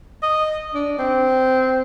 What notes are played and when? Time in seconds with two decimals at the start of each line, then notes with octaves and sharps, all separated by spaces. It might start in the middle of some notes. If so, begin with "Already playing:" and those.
0.23 D#5
0.74 D4
0.99 C4